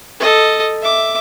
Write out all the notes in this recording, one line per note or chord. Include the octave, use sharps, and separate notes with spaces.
A4 D#5
E5 D6